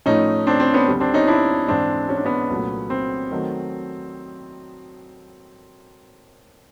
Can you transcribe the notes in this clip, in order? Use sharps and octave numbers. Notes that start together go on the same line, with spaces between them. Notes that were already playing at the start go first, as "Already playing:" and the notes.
A2 F3 A3 C#4 D#4
C4 D4
C4
B3 C#4
D2 D3 G3
C4 D4
C#4 D#4
D4 E4
G#2 E3 G#3 C4 D4
C#4
D4
B3 C#4
C2 A#2 F#3 A3
C4
D#3 F#3 A3